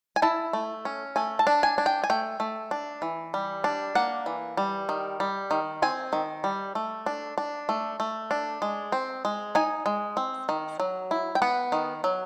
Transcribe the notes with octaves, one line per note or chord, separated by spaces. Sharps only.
G#5
E4 A5
A3
C#4
A3 G#5
A5
D4
G#5
D4
G5
G#5
A3 G5
A3
D4
E3
G3
D4
A#3 F#5
E3
G3
D#3
G3
D#3
C4 G#5
D#3
G3
A3
D4
D4
A3
A3
D4
G#3
C4
G#3
D#4 G#5
G#3
C4
D#3
F#3
E4
G5
B3 F#5
D#3
F#3